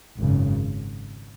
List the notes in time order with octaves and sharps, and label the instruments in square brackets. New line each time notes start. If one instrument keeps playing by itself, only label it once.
[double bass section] G#1 F#2 C#3